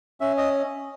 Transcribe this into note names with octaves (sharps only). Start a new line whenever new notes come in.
C#4 E5
D#5